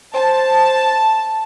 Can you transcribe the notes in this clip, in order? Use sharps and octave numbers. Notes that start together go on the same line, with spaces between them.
C5 A5